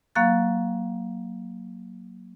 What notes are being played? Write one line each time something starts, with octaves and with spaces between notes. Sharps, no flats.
F#3 A#3 F5 C#6 F#6 A6